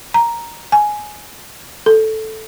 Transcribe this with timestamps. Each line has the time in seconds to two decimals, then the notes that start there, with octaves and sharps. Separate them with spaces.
0.14 A#5
0.72 G#5
1.86 A4